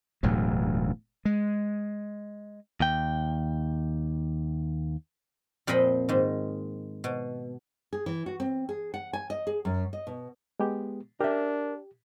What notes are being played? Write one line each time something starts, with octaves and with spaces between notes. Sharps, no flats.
E1 D2 A2 F#3
G#3
D#2 G5
F2 A#2 C4 C5 D#5 B5
G#2 D#3
B2
G#4
E3
F#4
C4
G#4
F#5
G#5
D#5
G#4
F#2
D#5
B2
G#3 B3 G4
D4 G4 A#4 E5